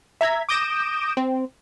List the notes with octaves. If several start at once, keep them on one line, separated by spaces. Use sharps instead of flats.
E5 A#5 G#6 B6
D6 D#6 G6 A#6 D7 E7
C4